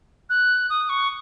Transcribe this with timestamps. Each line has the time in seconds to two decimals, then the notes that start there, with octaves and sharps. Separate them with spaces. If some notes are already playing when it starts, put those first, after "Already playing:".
0.30 F#6
0.70 D#6
0.89 C#6